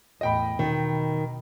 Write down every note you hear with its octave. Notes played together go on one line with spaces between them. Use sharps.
E2 A2 D#5 G5 B5
B2 D#3